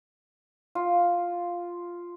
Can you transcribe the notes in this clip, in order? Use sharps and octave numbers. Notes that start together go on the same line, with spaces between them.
F4